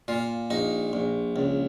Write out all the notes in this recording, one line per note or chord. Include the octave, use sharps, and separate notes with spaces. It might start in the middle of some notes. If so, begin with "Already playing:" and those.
A#2 F4
A#1 D#4
A#1
C#2